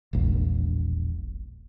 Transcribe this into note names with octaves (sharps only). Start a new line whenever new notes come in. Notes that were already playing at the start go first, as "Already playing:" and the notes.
E1 A#1